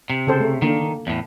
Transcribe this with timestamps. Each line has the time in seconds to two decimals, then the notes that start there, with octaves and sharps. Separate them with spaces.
0.10 C3
0.27 C#3 A4 C5
0.40 A3
0.62 D3 D#3 A#3
1.07 E2 A2